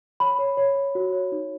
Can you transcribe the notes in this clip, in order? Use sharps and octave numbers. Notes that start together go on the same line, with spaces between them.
C#5 B5
C#5
C#5
C#5
F#4
C#5
D#4